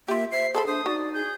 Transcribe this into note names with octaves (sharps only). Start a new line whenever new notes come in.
A#3 F4 G4 E5
C5 E5 C7
G#4 A4 A5 B5 C6
D4 C5 D#6
D#4 F#4 D5
G#4 G6